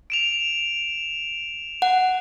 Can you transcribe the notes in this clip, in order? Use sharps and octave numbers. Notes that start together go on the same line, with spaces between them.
D7 E7 F7
F#5